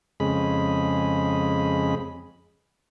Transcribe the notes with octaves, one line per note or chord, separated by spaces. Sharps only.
F2 C#3 G#3 B5